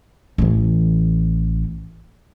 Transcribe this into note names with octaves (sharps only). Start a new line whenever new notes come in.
A1 E3